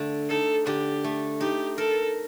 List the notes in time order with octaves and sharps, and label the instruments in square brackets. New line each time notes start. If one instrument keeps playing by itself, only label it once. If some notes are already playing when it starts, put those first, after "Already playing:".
Already playing: [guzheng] D3 A3
[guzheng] D#4 [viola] A4
[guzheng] D3 [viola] G4
[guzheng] A3
[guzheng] D#4 [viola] G4
[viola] A4 [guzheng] A#4